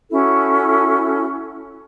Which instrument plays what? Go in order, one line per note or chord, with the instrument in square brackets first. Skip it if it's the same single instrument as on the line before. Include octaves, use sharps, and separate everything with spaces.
[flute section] C#4 E4 F#4 A4